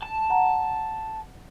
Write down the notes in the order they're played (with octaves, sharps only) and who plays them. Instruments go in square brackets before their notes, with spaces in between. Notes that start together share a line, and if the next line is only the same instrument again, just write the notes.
[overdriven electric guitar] A5
[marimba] F#5 A#5